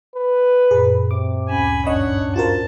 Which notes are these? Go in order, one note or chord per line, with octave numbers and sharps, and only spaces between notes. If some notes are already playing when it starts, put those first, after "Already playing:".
B4
F#2 A#2 G#4
C3 D6
D2 C#4 G#5 B5
G1 G2 C#4 D4 C#5 D#5 F#5 B5
F4 F#4 A#4 C5 A5